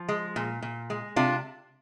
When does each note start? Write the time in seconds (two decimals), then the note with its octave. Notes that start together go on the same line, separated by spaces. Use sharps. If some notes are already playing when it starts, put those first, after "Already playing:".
Already playing: F3
0.09 G#3
0.36 A#2
0.62 A#2
0.90 G#3
1.16 C3 D4 F4